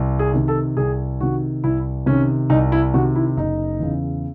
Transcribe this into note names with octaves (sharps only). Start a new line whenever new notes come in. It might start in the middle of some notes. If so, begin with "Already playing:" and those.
Already playing: C2
G#4
C3 D#3
A4
C2 G#4
C3 D#3 F#4
C2 E4
C3 D#3 C#4
C2 D#4
E4
C3 D#3 F#4
E4
F#1 D#4
E2 C#3